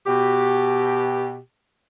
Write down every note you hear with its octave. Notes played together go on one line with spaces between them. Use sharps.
B2 G4